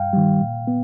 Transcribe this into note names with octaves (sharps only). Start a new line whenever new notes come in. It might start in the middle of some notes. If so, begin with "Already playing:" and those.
Already playing: G2 F5 G5
D#3 G3
A#2
B3